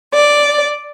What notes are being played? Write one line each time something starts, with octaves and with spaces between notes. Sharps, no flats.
D5